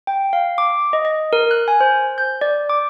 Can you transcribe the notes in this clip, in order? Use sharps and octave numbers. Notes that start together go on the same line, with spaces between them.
G5
F5
D6
D#5
D#5
A#4
F#6
G#5
C5
G6
D5
D6